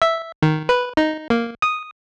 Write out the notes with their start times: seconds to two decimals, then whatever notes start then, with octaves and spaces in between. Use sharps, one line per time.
0.02 E5
0.42 D#3
0.69 B4
0.97 D#4
1.30 A#3
1.62 D#6